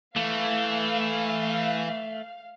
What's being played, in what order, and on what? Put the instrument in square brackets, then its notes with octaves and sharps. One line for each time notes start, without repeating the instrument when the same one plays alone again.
[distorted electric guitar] E3 [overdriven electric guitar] A3 [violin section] F5